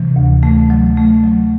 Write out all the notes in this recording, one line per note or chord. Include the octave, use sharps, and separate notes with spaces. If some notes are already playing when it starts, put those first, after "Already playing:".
Already playing: C3 E3
D2
A3
F#3
A3
F#3